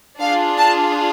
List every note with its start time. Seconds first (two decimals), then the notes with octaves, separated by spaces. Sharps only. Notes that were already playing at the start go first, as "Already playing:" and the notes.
0.19 D4 F4 G#4 F5
0.57 A5